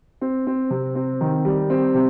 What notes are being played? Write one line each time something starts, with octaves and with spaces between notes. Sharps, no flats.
C4
C4
C3
C4
D#3
G3
C4
C3